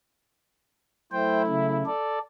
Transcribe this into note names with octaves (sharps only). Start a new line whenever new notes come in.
F#3 A3 E4 C5 G5
C#3
A4 D5